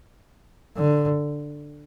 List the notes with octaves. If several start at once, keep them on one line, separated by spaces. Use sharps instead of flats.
D3